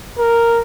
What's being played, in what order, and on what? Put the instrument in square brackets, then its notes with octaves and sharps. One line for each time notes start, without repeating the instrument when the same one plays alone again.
[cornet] A#4